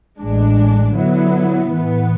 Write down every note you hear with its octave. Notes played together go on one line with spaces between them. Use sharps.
A1 A2 G#3 D4
D3 F#3 B3 E4
A2 E3 B3